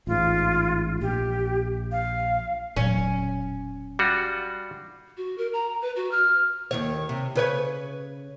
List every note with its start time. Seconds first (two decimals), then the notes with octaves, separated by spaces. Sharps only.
0.07 A1 G#2 F4
1.01 A#1 G4
1.92 F5
2.77 E1 A#2 F#3 C#4
3.99 G3 F4 F#4
5.17 F#4
5.38 A#4
5.53 A#5
5.82 B4
5.96 F#4
6.11 F6
6.71 D#2 D#3 C#5
7.09 C3
7.35 C#3 B4 C#5